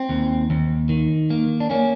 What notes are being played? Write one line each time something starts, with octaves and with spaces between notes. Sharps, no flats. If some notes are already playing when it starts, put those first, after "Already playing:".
Already playing: C4
D#2
D#2
D#3
A#3
D4
A#3 C#4